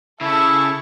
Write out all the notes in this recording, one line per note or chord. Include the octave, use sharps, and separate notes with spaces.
C#3 E4 A4 E5 A5 C#6